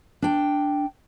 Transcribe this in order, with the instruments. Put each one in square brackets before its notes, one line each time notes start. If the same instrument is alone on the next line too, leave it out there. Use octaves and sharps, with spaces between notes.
[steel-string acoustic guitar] D4 G5